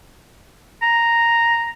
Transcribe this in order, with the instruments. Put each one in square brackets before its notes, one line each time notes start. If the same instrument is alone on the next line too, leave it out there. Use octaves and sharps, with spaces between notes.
[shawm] A#5